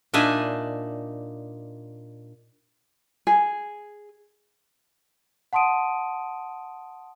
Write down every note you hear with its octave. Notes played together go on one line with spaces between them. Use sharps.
A#2 D4 D#4 E5 G#5
G#4
F#5 A5 C6 D#6 D7 D#7